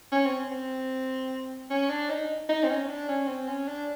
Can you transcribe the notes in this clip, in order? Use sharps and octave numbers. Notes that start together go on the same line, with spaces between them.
C#4
C4
C4
C#4
D4
D#4
D#4
C4
C#4
D4
C#4
C4
C#4
D4